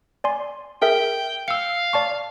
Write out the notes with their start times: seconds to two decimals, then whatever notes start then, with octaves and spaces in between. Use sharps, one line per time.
0.24 D5 G#5 C6
0.82 G#4 A#4 E5 G5
1.48 F5 E6 C#7
1.93 D5 A5 C#6